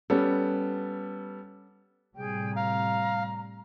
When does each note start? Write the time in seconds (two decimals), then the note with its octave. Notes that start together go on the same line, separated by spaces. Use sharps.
0.10 G3 B3 C#4 A4
2.16 A2 C3 G3 G#4 G5
2.56 F5 A#5